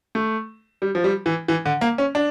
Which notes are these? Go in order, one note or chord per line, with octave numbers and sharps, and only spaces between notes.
A3
G3
F3
G3
E3
E3
D3
A#3
C#4
D4